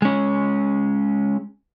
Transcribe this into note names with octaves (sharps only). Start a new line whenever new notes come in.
G#3 C#4